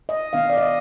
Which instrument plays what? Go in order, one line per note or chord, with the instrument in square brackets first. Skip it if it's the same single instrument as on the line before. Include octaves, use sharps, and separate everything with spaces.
[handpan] D#5
D#3 B3 D4 F5
D5
D#5